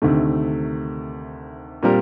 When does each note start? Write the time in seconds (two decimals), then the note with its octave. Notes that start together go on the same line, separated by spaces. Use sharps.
0.02 D2 C3 D#3 A3
1.83 A#2 G3 C4 G4 A#4